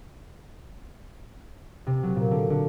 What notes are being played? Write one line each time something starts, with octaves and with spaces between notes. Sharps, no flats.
C3
F#3
A#2
D3
D3